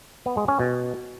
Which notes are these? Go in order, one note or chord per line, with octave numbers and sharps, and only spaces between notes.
B3
G#3
C#4
B2